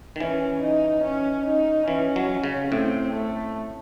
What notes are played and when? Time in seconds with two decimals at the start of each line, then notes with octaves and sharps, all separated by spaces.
0.16 D#3
0.20 E3 C#4
0.62 D#4
1.04 C#4
1.46 D#4
1.88 E3 C#4
2.16 F#3
2.44 C#3
2.72 A2 C4
3.14 A3